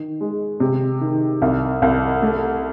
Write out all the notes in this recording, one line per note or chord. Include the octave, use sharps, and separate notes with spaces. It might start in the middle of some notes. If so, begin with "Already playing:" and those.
Already playing: D#3
G#3
C3
D#3
C2
C2
A3